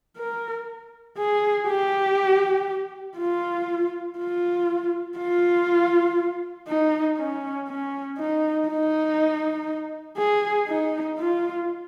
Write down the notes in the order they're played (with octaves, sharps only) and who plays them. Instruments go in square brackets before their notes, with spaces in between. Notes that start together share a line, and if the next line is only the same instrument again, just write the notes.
[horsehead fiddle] A#4
G#4
G4
F4
F4
F4
D#4
C#4
C#4
D#4
D#4
G#4
D#4
F4